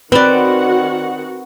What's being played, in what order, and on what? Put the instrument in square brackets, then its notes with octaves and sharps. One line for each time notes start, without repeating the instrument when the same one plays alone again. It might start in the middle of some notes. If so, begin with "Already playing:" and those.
[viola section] D#3 F#4 F#5 [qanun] C4 D5 [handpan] B4